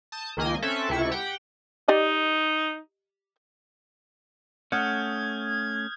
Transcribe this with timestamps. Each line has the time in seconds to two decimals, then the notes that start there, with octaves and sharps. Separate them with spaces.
0.12 A5 D#6 G6
0.37 C#2 D#3 A#3 D#5 G#5
0.62 C4 C#4 A4 E5 F#6
0.89 C#2 C3 E4 A4 C#6
1.11 G4 F#5 G5
1.88 D#4 G4 D5 D#5
4.72 A3 C#4 F#5 D#6 F6 G6 G#6